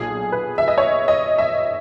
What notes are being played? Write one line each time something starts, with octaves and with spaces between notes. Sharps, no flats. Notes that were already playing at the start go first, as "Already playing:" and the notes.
Already playing: B1 A#2 G#4
B4
E5
D#5
C#5
D#5
E5